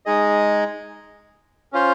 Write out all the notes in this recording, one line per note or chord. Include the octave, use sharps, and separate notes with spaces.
G#3 D#4 G#4 D#5
C#4 F4 C5